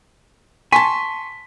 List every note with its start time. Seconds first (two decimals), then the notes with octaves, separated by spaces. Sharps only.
0.72 G#5 A5 C6 C#6 B6